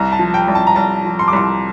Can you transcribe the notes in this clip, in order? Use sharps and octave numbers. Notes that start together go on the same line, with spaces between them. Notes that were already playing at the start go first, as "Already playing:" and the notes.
Already playing: C2 A#5
A5
F3
G5
C2
A5
A#5
C2 A5
F3
C6
D6
C2 C6